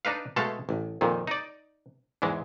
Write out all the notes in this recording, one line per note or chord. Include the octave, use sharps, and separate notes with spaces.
D4 D#4 B4 F5
B2 G#3 A3 A4 F5
A1
F2 A#2 D#3
D#4 D5
E2 G#2 E3 G#3